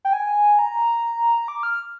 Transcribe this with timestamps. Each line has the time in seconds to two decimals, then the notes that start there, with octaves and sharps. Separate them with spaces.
0.05 G5
0.13 G#5
0.59 A#5
1.48 D6
1.63 F6